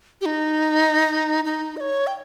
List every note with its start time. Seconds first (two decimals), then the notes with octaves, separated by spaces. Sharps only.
0.21 G4
0.26 D#4
1.45 D#4
1.77 D#5
1.80 C#5
2.07 G5